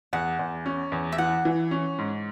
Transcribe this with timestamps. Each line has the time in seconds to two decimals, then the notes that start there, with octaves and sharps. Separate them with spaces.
0.13 E2 F#5
0.39 E2
0.66 C#4
0.92 E2
1.12 E5
1.18 E3 F#5
1.45 E3
1.71 C#4
1.98 G#2